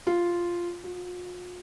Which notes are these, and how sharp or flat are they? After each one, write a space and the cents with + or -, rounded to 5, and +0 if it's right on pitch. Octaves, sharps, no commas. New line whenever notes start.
F4 -5
F4 +45